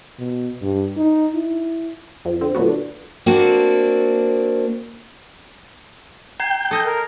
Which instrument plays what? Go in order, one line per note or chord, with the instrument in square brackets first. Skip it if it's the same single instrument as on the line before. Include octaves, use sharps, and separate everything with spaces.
[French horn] B2
G2
D#4
E4
[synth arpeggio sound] F2
D3 C4
A#2 D3 F#3 A3 B3 F#4
D4
[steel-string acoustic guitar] A#3 C4 D4 F#4
[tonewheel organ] G5 [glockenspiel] A#5 G#6 C7
[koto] A4 D#5
[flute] A#4